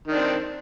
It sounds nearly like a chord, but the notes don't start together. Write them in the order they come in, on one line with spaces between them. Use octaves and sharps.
D#3 D4 C4